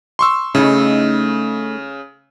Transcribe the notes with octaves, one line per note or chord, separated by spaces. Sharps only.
C6 C#6 E6
C#3 A3 D#4 E4